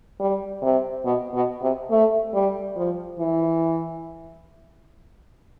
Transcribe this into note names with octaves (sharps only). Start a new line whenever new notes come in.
G3
C3
B2
B2
C3
A3
G3
F3
E3